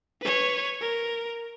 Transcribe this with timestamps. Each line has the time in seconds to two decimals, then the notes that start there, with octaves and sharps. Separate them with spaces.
0.21 B4 C#5
0.81 A#4